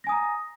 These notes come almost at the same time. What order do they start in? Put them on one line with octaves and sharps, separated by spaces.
A#6 G#5 D#6 A#5